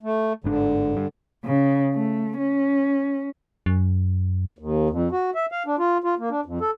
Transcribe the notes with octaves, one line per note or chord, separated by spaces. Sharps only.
A3
G1 G#2 D3 D4
G2
C#3
A3
C#4
F#2
D#2
F2
F#4
E5
F5
D4
F4
F4
A#3
D4
F2
A4